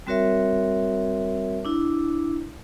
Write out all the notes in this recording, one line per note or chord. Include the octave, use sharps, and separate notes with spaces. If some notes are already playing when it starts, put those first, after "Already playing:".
G3 C4 F#4 A#4 C#5 E5
D4 E4